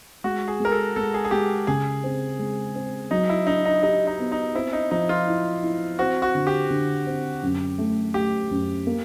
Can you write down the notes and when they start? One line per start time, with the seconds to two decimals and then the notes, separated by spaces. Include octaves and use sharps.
0.24 G#3 F#4
0.48 G#4
0.60 G#3 A#4
0.72 A4
0.96 G#3 A4
1.14 G#4
1.25 G#4
1.31 G#3 G4
1.67 C#3 G#4
2.04 C4
2.39 G#3
2.76 C4
3.11 F#3 D#4
3.29 E4
3.47 D4 D#4
3.65 D#4
3.83 D#4 G4
4.07 D#4
4.19 B3
4.32 D#4
4.55 C4 E4
4.73 D#4
4.91 F3 D#4
5.09 F4
5.27 E4
5.63 E4
5.99 C4 F#4
6.22 F#4
6.35 D3
6.47 G4
6.70 D3
7.07 C4
7.43 F#2
7.78 A3
8.14 A3 G4
8.51 F#2
8.87 A#3